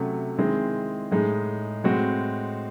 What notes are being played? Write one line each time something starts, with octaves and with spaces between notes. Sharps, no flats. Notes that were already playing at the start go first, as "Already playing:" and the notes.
Already playing: C3 F#3 A3 C#4
D#3 G#3 C4 E4 G#4
A2 G#3 D#4 G#4
A2 G#3 C4 F#4